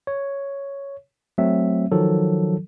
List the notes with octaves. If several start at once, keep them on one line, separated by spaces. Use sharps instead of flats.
C#5
F#3 A3 C4 E5
D#3 F3 F#3 A4